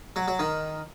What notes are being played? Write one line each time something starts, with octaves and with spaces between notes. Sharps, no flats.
F#3
F#3
D#3